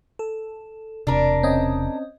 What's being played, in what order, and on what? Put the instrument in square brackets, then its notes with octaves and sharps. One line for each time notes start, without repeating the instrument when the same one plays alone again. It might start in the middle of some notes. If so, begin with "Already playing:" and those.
[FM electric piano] A4
[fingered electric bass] E1 C3 [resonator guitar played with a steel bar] D4 A#4
[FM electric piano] C4 C#4 D#5